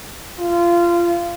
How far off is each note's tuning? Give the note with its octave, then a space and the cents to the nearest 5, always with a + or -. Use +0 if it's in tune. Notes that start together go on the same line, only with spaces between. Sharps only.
F4 -20